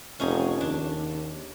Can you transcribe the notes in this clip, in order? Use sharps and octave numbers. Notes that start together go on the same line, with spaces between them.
F1 C#4 D#4 G#4
D#2 D4